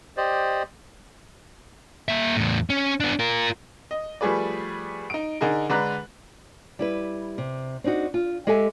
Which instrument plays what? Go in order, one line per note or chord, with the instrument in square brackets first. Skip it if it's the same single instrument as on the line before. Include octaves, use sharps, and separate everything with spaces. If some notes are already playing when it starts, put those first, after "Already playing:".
[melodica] G4 C5 D5 D#5
[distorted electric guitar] A#3 E5
E2 A2
C#4
B3 D4
F4 A#4
[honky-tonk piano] D#5
F3 G3 A3 G#4 B4 D5
D#4 D7
D3 D#4 G#4 A#4
D3 G#3 B4 D5 A#5 F#6
[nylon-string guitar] G3 E4 B4
C3
C4 D4 D#4 F#4
F4
G#3 G4 A4 E5 G#5